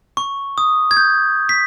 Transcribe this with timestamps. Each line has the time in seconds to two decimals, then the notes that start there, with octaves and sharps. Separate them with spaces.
0.17 C#6
0.58 D#6
0.91 G#6
0.97 G6
1.49 B6